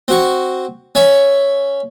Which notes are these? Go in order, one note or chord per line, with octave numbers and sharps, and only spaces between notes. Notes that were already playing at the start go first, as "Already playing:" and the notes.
C4 F#4 C#6
C#4 C#5 E5